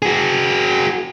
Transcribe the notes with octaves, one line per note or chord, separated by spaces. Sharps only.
F#4 G#4